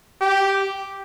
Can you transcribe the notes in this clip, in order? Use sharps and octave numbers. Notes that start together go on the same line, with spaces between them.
G4